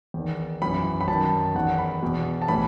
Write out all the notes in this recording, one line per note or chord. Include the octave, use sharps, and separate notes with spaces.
E2 D#3
F#2 E3 B5
B5
F#2 D#3 A5
E2 D#3 F#5
B5
E2 B2
A5
A2 E3 B5